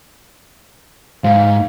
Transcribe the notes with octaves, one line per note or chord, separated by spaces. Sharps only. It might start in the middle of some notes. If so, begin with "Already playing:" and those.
G#2 F5